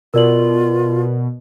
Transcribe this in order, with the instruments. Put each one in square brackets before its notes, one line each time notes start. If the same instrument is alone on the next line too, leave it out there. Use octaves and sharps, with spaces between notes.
[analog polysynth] B2 [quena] F4 [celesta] A#4 D5 F#7